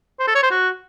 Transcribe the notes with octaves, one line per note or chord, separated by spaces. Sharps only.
C5
A4
C#5
C5
F#4